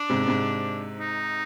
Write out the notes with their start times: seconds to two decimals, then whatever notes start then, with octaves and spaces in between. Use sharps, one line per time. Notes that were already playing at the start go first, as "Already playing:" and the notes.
Already playing: D4
0.10 G#2 C3
0.27 G#2 C3
0.99 D#4